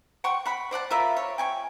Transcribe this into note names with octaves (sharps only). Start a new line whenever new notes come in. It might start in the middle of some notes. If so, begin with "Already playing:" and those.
F#5 G5 C6 C#6
F#5 B5
C5 D5 F#5 A5
F4 A#4 E5 B5
C#5
G5 G#5 C#6